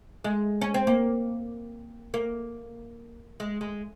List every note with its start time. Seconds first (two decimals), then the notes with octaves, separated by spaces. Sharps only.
0.24 G#3
0.61 C#4
0.74 C4
0.87 A#3
2.14 A#3
3.40 G#3
3.61 G#3